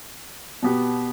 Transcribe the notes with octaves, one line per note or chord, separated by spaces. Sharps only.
B2 B3 G4